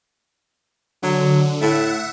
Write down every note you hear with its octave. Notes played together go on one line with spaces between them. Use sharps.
D3 F#3
A2 E5 F#5